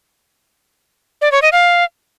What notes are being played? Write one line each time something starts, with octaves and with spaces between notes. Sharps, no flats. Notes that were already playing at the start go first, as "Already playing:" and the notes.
D5
C#5
D#5
F5